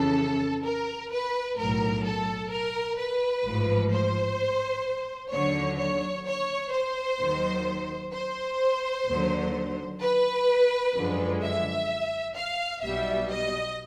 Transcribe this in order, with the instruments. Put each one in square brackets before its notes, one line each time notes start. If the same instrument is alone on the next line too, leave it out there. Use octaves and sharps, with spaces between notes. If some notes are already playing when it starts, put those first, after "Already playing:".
Already playing: [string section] F2 C#3 E3 A4
A#4
B4
B1 A2 F#3 A#4
A4
A#4
B4
A1 G#2 F3
C5
D#2 D3 F#3 C#5
C#5
C#5
C5
D#2 D#3 F#3
C5
D#2 D3 F#3
B4
F#2 D3 F3 G#3
E5
F5
B1 B2 G3 E5
D#5